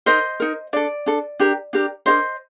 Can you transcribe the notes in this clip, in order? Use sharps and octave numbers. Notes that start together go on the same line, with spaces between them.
D#4 A#4 C5 D#5
D#4 A#4
D4 A4 D5
D4 A4
D4 G4 A#4
D4 G4 A#4
D4 G4 A#4 C5 D#5